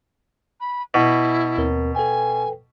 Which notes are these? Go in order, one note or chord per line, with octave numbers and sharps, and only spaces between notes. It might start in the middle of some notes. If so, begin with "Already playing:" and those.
B5
B2 E4
D#2 C4 A#4
A4 B4 G5 G#5